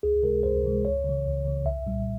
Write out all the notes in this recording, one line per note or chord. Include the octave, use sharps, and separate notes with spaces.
C#2 G#4
C3 E3 G#3 A#4
C#2 C5
C3 E3 G#3
C#2 C#5
C#3 E3
C#2
C#3 E3
C2 E5
A#2 G3